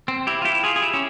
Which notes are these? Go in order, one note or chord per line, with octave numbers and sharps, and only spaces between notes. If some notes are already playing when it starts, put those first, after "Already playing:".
C4
E4 G4
F4
E4 G4
F4 G#4
G#4
E4 G4
C#4